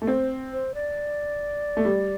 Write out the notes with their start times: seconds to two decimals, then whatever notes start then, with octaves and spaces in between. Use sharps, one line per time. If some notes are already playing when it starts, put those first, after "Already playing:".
0.02 A3
0.07 C4 C5
0.53 C5
0.75 D5
1.77 A3
1.85 G3